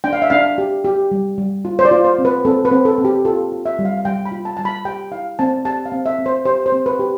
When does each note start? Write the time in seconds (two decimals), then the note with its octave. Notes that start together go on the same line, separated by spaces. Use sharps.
0.04 D4 G5
0.13 F5
0.22 E5
0.30 D4 F5
0.58 G4
0.85 G4
1.11 G3
1.38 G3
1.65 F4
1.79 C5
1.85 D5
1.91 F4
2.05 C5
2.19 C4
2.25 B4
2.45 C4 A4
2.65 B4
2.72 C4
2.85 A4
2.98 C4
3.05 G4
3.25 F4 A4
3.52 F4
3.66 E5
3.79 G3
3.85 F5
3.98 F5
4.05 G3 G5
4.26 B5
4.32 F4
4.45 A5
4.57 G3 A5
4.65 B5
4.85 G4 G5
5.12 E4 F5
5.39 C4 A5
5.65 G4 A5
5.86 F5
5.92 C4
6.06 E5
6.19 C4
6.26 C5
6.45 G4 C5
6.66 C5
6.72 C4
6.86 B4
6.99 G4